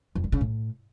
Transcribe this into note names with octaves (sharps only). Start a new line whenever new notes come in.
F2
D3
C#3
A2